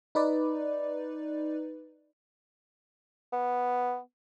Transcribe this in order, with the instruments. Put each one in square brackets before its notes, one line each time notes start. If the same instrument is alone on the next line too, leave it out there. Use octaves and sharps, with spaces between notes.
[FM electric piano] D#4 B4 D5
[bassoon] B3